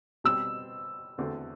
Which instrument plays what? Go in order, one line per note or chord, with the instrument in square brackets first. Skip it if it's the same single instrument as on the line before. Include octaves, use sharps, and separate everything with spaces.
[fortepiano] B2 G3 C4 [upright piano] E6
[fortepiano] E2 D3 A3 C4 F#4